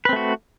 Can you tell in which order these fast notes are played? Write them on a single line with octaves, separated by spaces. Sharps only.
B4 C4 A3 F#4